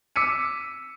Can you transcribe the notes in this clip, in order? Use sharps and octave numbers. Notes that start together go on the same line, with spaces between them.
D6 E6 B6 C#7 D#7